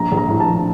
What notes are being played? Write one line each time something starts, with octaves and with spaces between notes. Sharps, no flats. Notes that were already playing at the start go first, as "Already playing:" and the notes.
Already playing: A#1 A#5
A#1
A#5
A2
A5
F3